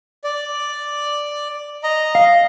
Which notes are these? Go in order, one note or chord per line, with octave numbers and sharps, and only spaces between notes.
D5
D#5 A#5
F5